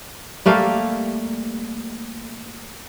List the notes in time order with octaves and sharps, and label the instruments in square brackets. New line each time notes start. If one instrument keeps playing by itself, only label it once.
[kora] G3 A3 A#3 F5